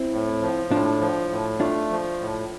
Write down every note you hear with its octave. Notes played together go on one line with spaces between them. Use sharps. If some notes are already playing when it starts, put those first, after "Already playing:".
Already playing: C4 E4
A2
F3
A2 D4 F4
F3
A2
A3 D4 F4
F3
A2